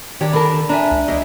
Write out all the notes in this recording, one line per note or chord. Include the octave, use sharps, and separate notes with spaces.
D#3 D4 G4 C#5 D5 A#5
D3 A#4 A5 B5
D4 E5 G#5 A#5
C#2
E2 D#5 E5